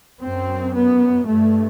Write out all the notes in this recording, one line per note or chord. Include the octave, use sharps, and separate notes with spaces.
F#2 C4
B3
G2 A3